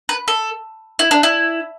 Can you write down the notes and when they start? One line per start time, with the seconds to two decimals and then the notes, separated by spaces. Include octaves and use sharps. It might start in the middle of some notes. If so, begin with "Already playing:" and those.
0.09 B4
0.28 A4
0.99 E4
1.11 D4
1.23 E4